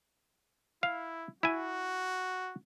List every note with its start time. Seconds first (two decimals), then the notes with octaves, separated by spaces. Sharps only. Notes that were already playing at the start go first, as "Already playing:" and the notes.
0.83 E4 F5
1.43 E4 F#4 G#5